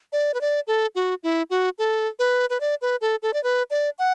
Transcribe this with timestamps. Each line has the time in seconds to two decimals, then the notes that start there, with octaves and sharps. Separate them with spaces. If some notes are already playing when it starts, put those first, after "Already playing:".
0.12 D5
0.34 B4
0.41 D5
0.67 A4
0.95 F#4
1.23 E4
1.50 F#4
1.78 A4
2.19 B4
2.50 B4
2.60 D5
2.82 B4
3.01 A4
3.23 A4
3.34 D5
3.44 B4
3.71 D5
3.99 F#5